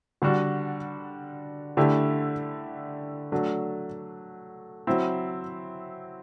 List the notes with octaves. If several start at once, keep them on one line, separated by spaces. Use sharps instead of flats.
D3 G3 D4 F#4
D3 A3 E4 G4
F#3 A3 D4
F#3 C4 E4